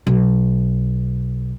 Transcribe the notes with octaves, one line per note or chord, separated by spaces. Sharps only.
B1